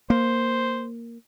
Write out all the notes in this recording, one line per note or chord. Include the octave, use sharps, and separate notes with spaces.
A#3 C5